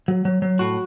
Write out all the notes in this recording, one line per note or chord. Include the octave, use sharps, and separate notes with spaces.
F#3
F#3
F#3
A2 F#4